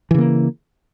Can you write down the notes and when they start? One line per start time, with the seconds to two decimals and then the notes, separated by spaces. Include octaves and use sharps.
0.11 E3
0.14 C#3
0.18 A#3